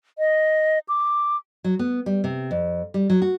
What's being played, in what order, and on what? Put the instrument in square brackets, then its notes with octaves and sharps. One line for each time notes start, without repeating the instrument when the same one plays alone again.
[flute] D#5
D6
[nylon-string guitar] F#3
B3
G3
C3
F2
G3
F#3
F#4